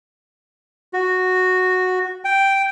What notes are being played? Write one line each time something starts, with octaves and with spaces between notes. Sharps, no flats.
F#4
G5